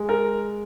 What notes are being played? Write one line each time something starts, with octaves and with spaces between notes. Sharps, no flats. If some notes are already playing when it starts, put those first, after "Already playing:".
Already playing: G#3
A#4